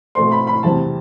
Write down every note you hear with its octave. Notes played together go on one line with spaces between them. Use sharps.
B2 A3 C4 C6
B5
B5
E2 C3 G3 C4 A5